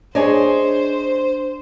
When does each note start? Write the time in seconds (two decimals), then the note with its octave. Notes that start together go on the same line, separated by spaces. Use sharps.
0.15 D4 G#4 C5 C#5 D#5